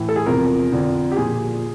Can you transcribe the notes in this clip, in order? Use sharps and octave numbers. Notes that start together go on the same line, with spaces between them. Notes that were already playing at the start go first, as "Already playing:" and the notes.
Already playing: A2 E3
A4
G#4
E2 C3 F3 A#4
F2 D3 F3
G4
A#2 F3 G#4